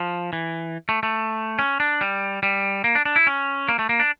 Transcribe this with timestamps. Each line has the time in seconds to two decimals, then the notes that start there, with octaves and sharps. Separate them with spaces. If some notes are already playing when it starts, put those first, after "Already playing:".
Already playing: F3
0.33 E3
0.89 A3
1.03 A3
1.59 C#4
1.80 D4
2.01 G3
2.43 G3
2.84 A#3
2.95 D4
3.05 D4
3.16 E4
3.27 C#4
3.69 A#3
3.79 A3
3.89 A#3
4.00 D4